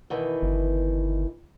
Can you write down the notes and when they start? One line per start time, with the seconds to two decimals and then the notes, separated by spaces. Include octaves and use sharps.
0.10 B2 D#3 E3
0.42 G1